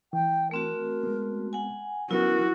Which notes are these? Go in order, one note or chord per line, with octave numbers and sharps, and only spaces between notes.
E3 G5
A3 C4 F#4 A#4
G#3 B3
F#5 G#5
F#3 B3 C#4 E4 F#4 A#4